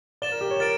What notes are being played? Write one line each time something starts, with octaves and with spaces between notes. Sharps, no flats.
D5 A6 E7 G7
A#4
G4
C#5
A#4 A6 D7